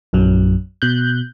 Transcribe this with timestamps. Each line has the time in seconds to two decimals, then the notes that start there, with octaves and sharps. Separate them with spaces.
0.13 A#1 F#2 F#3
0.82 B2 F#6 G6